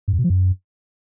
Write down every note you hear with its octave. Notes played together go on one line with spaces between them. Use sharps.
G2
F2
B2
F3
F#2